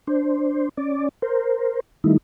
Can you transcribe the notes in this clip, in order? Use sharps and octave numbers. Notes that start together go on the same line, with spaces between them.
D4 C5
C#4 D5
A#4 C5
D#3 G3 A3 D#4 E4